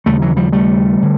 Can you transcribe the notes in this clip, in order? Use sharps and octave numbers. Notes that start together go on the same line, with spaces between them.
D#2 C#3 G3 A3
E3 F#3
F3 G3
G3 A3
D3